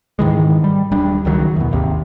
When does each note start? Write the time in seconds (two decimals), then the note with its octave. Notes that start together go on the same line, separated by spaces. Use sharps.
0.19 G#2 D#3 E3 G#3
0.64 G3
0.91 D#1 G3 D4
1.25 C#2 D#3 F#3
1.56 E2 B2
1.71 G#1 D#2 C3